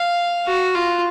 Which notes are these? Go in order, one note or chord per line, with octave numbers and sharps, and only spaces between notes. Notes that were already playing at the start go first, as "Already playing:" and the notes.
Already playing: F5
F#4
F4